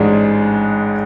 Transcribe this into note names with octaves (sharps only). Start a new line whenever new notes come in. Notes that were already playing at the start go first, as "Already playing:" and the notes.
Already playing: A1 G#2 G#3 D4 G#4